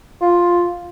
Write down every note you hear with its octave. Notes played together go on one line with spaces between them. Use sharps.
F4